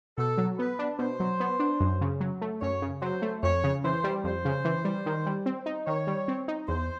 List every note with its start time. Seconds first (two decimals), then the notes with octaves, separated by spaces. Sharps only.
0.18 B2 A4
0.38 F#3
0.58 B3 B4
0.79 D4
0.99 B2 C5
1.20 F#3
1.40 B3
1.59 D4
1.80 F#2
2.01 C#3
2.20 F#3
2.41 A3
2.62 F#2 C#5
2.82 C#3
3.02 F#3 C5
3.22 A3
3.43 F2 C#5
3.64 C#3
3.84 E3 C5
4.04 G3
4.24 F2 C5
4.45 C#3
4.65 E3
4.85 G3
5.06 D#3
5.26 G3
5.46 C4
5.66 D#4
5.87 D#3 C#5
6.07 G3
6.28 C4
6.48 D#4
6.68 E2 C5